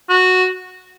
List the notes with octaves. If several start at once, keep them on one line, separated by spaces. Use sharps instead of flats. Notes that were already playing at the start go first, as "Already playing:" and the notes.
F#4